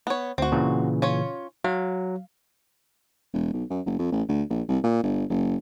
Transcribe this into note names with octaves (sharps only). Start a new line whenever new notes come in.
B3 C#5
D2 C4 F#4
A#2 C#3 E3
C#4 F4 C#5
F#3 F5
E1
B1
F#2
F#1
F2
A1
D2
A#1
C2
A#2
G1
F#1